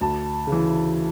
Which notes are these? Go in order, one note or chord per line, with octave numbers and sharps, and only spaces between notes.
D2 A5
C#3
E3